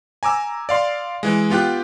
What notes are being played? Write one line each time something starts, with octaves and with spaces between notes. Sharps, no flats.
G#5 A#5 D6 E6
D5 F5 C6
E3 G#3
B3 F4 G4 G5 F#6